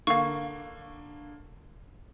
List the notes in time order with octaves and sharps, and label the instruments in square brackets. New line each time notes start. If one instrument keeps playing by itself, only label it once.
[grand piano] D3 A#3 [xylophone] F5 C#6